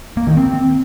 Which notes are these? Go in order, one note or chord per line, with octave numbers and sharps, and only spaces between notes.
A#3
D#3
C4